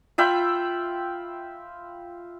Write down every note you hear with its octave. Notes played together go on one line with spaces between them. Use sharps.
F4 E5 G5 B5